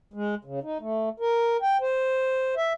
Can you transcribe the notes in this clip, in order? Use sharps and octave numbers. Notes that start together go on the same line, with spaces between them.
G#3
C#3
D#4
A3
A#4
G5
C5
E5